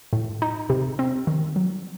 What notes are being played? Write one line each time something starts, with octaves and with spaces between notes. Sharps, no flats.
A2
D#4
C3
C4
D#3
F#3